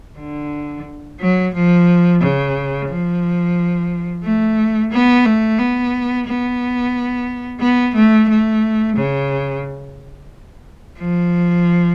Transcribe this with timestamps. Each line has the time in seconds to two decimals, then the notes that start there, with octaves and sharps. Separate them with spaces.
0.19 D3
1.20 F#3
1.54 F3
2.21 C#3
2.89 F3
4.23 A3
4.91 B3
5.25 A3
5.59 B3
6.27 B3
7.61 B3
7.94 A3
8.29 A3
8.96 C#3
10.99 F3